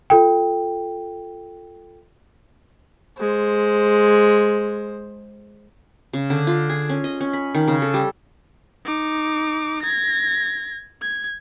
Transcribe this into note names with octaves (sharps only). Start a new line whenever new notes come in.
F4 A4 G5
G#3 C5
C#3
D3
F4
G#4
C#4
D#5
C#4
B5
D#3
C#3
A4
G3
D#4 D6
G#6 A#6
G#6